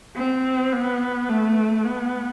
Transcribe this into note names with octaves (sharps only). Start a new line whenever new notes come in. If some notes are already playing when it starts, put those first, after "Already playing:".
C4
B3
A3
B3